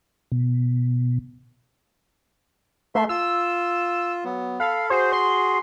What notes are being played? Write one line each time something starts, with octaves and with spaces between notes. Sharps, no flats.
B2
A3 E5 C6
F4 E6
F#3 B3
A4 F5 B5
F#4 G#4 C5
C6